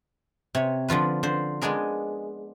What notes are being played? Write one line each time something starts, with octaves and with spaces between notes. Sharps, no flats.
C3 C#5
D3 F3 F4 B4
D3 C5
G#3 B3 D4 G#4 A#4